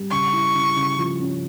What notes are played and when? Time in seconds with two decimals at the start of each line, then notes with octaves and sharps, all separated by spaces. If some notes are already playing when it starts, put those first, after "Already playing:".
Already playing: G3
0.11 C#3 C#6
0.33 E4
0.55 C#3
0.76 C#3
0.98 F3
1.20 C#4